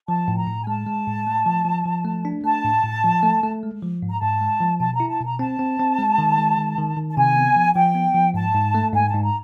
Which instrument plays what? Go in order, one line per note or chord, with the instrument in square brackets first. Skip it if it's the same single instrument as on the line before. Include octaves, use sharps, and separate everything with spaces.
[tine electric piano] F3 [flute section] A5
[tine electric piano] A2
[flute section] A#5
[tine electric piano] A2
[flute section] G#5
[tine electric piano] G#3 [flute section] A5
[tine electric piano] G#3
A2
A3
F3
F3
F3
A3
D4
[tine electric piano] A3 [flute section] A5
[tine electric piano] A2
A2
F3
A3
A3
G#3
F3
G#2
[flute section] A#5
[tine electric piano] G#2 [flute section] A5
[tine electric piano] G#3
F3
[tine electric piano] B2 [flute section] A5
[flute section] A#5
[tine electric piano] E4
[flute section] A5
[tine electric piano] B2 [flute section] A#5
[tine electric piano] C4 [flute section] A5
[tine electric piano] C4
C4
G#3
D#3
G#3
D#3
D#3
D#3
[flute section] A5
[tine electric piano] C3 [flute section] G#5
[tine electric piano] B3
F3
[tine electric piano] F3 [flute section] G5
[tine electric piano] B3
F3
[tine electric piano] G#2 [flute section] A5
[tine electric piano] G#2
A3
[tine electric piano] G#2 [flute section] G#5
[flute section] A5
[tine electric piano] G#2
[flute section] A#5